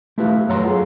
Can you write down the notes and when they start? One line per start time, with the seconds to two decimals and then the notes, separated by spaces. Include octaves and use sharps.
0.18 A3 E4 F4 G4 B4 F5
0.49 F#2 A3 C#5 F#5 A#5 C6
0.65 F4 G#4 F5